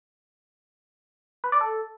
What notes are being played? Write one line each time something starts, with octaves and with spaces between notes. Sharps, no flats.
B4
D5
A4